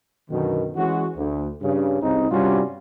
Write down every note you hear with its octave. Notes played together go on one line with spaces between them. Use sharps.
F#2 B2 D3 D#3
E3 G#3 C#4 F#4
D2
G2 C#3
C2 C#3 C4 D#4
G2 C3 G3 C#4 F4 F#4